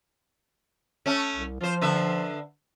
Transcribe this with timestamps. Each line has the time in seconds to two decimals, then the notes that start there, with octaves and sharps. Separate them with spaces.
1.06 A3 C#4
1.34 C2
1.61 F3 F4 C5
1.81 D3 B4 E5